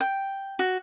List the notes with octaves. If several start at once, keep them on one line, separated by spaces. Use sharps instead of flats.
G5
F#4